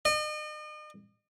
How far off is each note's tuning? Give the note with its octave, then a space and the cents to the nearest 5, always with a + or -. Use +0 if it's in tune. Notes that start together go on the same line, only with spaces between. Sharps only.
D#5 -40